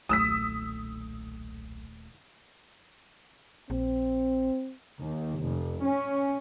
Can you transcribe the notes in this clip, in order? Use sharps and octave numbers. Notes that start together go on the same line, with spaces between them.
D#1 B1 F#3 A3 D#6 E6 B6
A#1 C4
D#2
F1
C#4